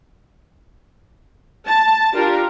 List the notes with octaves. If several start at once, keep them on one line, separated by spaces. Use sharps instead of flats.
A5
D4 F4 G4 A#4